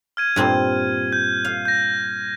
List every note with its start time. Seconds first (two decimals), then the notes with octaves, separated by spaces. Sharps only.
0.17 F6 G#6 D#7
0.36 G2 A#2 C4
1.13 G6
1.45 F5
1.65 G6 A#6